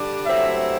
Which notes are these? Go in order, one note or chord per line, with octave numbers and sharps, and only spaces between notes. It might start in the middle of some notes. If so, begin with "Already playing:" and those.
Already playing: D3 G3 D4
G2 F#3 A3 C4 E4 E5